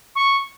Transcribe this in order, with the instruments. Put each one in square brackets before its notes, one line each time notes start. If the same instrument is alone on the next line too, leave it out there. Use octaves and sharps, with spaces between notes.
[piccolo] C#6